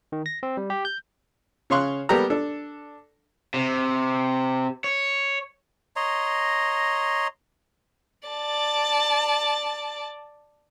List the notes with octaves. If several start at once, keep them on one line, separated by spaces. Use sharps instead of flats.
D#3
A#6
C4
G3
G4
G6
C#3 C#5 F5 C6 C#6 F#6
G3 A#3 B3 G4 A4 A#5
D4 A4
C3
C#5
C#5 D#5 A#5 C6
D5 A5